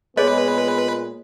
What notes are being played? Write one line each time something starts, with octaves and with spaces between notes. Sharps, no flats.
A#2 G#3 B3 G#4 B4 C#5 D#5